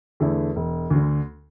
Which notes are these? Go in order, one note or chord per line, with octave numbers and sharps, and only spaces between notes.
E2 D3 A3 E4
E1
D2
D3